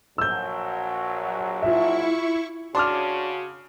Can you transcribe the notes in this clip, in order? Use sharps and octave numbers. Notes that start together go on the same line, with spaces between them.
A#1 F#3 E6 G6
E4 F4 E5 C#6
C#3 D4 F#4 C6 D6 F6